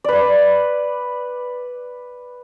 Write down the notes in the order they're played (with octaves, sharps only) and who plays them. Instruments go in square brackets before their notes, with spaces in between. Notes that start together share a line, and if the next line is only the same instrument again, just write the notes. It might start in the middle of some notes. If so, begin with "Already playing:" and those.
[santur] B4 D5